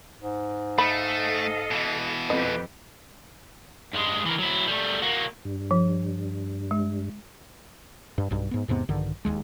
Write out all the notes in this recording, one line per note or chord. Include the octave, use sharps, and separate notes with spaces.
G#2
A3 A4 D#5 F5 B5
B2 E3
F2 G4 B4 D#5
G2 G#3
E3 A#4
F#3 E4
G3 A3
A#3 F#4
G2
F3
G#3
G2
B1 G2
G#2 B3
E2 G#2 C3 B3
A#1 G2 D3 D#3
D1 A#1 D#2 G#3